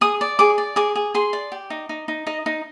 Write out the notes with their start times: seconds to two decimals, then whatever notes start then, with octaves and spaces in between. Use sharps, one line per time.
0.01 G#4 D#6
0.21 D5
0.39 G#4 D6
0.58 D5
0.76 G#4 D6
0.96 G#4
1.15 G#4 C6
1.33 D5
1.52 G4
1.70 D#4
1.89 D#4
2.08 D#4
2.27 D#4 D#5
2.46 D#4